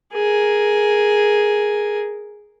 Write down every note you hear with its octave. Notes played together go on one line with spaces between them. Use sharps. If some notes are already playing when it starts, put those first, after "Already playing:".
G#4 A#4